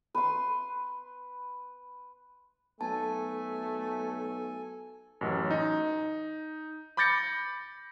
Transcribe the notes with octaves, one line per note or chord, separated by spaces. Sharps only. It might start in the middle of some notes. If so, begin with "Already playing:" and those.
B4 C6
B1 A3 A4 G#5 A5
A1 F#2
D#4
B5 D6 G6 A6 A#6 C#7